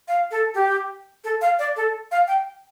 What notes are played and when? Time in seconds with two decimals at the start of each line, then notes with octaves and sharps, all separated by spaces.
0.08 F5
0.31 A4
0.54 G4
1.24 A4
1.41 F5
1.59 D5
1.76 A4
2.11 F5
2.28 G5